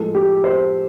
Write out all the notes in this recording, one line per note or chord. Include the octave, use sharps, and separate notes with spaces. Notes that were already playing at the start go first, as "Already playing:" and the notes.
Already playing: A2 F3 G#3 A4
G4
C5